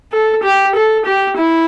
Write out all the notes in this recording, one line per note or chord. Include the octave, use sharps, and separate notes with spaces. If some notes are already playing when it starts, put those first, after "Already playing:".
A4
G4
A4
G4
E4